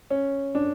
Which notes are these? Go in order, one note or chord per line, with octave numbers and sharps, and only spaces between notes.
C#4
D4